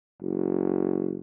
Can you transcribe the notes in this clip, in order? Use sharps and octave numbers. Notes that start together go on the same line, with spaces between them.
F#1